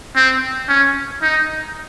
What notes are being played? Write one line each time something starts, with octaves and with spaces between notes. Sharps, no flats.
C4
C#4
D#4